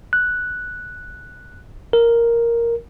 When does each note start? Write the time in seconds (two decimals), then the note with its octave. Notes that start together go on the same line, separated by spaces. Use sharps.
0.13 F#6
1.93 A#4